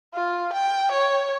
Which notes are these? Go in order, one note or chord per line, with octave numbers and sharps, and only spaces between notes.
F4
G5
C#5